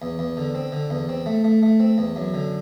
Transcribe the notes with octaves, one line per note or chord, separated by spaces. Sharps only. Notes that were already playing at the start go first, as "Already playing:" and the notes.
E2
E2
D3
C4
D3
E2
C4
A3
A3
A3
C4
E2
F#2
D3